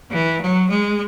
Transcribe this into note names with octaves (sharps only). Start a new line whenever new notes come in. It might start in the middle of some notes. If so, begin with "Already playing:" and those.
E3
F#3
G#3